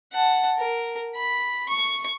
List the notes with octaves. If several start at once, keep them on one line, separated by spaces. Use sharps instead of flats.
F#5 A5
A#4
B5
C#6